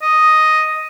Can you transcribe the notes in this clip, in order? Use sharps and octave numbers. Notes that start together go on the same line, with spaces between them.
D#5